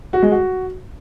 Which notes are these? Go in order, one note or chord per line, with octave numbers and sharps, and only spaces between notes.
F#4
G#3
F#4